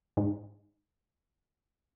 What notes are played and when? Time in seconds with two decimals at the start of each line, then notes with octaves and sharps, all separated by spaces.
0.17 G#2